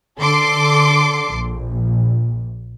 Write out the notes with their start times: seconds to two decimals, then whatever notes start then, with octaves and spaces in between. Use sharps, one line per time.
0.19 D3 A4 C6 D6 C7
1.33 A#1